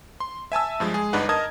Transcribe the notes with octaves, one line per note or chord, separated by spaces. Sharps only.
C6
E5 G#5 A5 E6
G2 F3 G#3
G#3 G#4
G1 G2 D4 D#4 B4 F#5
A#4 D#5 A5 D#6 G#6